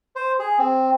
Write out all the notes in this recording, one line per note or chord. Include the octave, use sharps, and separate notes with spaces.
C5
G#4
C4